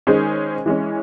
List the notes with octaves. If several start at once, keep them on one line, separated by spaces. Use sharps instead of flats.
D#3 G#3 C#4 G#4 C5
E3 G#3 C#4